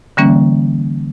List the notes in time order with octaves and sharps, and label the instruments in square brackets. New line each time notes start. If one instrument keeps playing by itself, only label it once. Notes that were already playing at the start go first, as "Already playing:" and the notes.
[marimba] D3 E3 G3 A#3 C#4